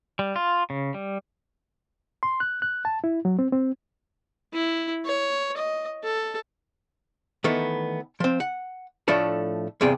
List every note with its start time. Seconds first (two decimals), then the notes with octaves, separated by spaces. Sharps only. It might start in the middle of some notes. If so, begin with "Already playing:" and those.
0.19 G3
0.36 F4
0.70 C#3
0.94 G3
2.23 C6
2.40 F#6
2.62 F#6
2.85 A5
3.04 E4
3.25 F#3
3.39 C4
3.53 C4
4.53 E4
5.05 C#5
5.57 D#5
6.03 A4
7.44 D#3 E3 A3 B3 D#4
8.20 F3 C4
8.40 F#5
9.08 A2 F3 A3 D4 A4
9.81 E2 G2 C3 G#4 G5